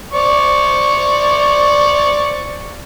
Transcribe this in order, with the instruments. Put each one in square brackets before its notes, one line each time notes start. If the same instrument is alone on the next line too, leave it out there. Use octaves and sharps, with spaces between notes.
[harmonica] C5 D5 C#6